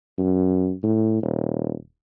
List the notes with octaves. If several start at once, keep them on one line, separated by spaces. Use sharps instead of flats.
F#2
A2
D#1